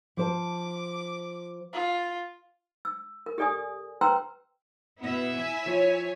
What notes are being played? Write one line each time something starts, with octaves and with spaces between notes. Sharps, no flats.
F3 C5 A5 D6
F4
E6
A#4
G4 A4 D5 G#5 D#6
B4 C5 G5 A#5 C6 E6
B2 B3 E4 E5
G#5 B6
F3 C#5